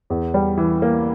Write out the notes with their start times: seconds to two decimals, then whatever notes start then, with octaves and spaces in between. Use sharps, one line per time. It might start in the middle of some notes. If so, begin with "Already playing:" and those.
0.10 E2
0.34 G3
0.58 E3
0.82 A#3